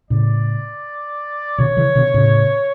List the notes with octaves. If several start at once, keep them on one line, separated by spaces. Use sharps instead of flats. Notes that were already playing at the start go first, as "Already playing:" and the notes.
A2 C#3 D5
B2 D3 C#5
C#3 E3
B2 D3
A2 C#3